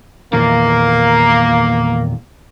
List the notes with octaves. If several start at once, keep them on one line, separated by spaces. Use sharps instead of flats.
E2 A#2 D#3 A#3